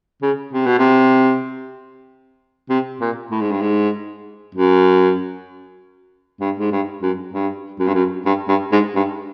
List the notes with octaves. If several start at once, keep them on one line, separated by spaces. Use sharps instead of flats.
C#3
C3
B2
C3
C3
A#2
A2
G#2
G2
G#2
F#2
G2
G#2
G2
F#2
G2
F#2
G2
F#2
G2
G2
G#2
G2